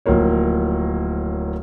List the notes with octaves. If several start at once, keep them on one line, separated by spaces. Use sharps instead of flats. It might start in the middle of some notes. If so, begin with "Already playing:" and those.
D1 F3 A#3 C#5